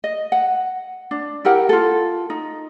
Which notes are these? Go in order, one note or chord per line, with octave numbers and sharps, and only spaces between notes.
D#5
F#5
D4
E4 G4 A#4 F#5
F4 A4
D#4